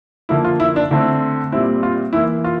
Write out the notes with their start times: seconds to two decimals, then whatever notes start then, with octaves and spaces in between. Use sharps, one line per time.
0.29 D3 F3 A#3 E4
0.44 F4
0.60 E4
0.76 D4
0.91 D3 A3 C4 E4
1.52 A#2 G3 C4 E4
1.83 F4
2.13 E3 A#3 E4
2.44 F4